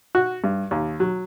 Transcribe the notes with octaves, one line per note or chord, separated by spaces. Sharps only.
F#4
G2
D#2
F#3